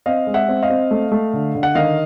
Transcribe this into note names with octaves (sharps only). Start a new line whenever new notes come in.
C4 D#5 F5
G#3
E5 F#5
C4
D#5 F5
C4
A3
A3
D3
D3
F#5
D#3 D#5 F5